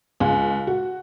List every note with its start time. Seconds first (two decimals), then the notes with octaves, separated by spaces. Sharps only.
0.20 C#2
0.67 F#4